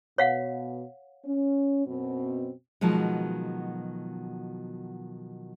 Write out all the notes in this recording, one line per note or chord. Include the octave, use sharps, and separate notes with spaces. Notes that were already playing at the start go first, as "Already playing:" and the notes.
B2 C#5 F5 F#5
C#4
F#2 B2 C4
B2 D#3 F3 F#3 G#3